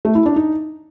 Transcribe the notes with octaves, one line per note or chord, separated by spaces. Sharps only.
A3
E4
D4
D#4